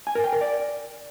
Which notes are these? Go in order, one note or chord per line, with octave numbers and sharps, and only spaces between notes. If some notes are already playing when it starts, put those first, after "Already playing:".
G#5
A#4
G5
A#4
D5